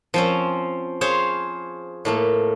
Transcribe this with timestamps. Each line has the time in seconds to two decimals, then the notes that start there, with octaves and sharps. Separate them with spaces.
0.14 F3 C4 C#4
1.01 G#4 C5 C#5 F5
2.05 A2 A3 A#3